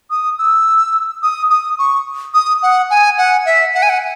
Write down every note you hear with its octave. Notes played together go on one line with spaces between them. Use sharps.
D#6
E6
D#6
D#6
C#6
D#6
F#5
G#5
F#5
E5
F#5
G#5
F#5